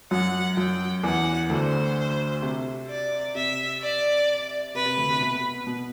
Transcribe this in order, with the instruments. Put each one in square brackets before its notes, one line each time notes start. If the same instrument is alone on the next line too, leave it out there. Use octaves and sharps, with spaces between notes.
[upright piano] F#2 F#3 [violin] F#5
[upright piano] F#2 F#3 [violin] G5
[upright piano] E2 E3 [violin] F#5
[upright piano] D2 D3 [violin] C5
[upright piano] C3
[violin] D5
[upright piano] C3 [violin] E5
[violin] D5
[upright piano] C3 [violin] B4
[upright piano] C3
D2 D3
C3
B2
B2